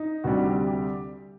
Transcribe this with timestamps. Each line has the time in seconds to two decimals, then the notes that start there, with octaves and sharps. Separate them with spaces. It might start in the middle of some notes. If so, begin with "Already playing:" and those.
Already playing: D#4
0.24 D2 C3 G3 F#4
0.45 G4
0.67 G4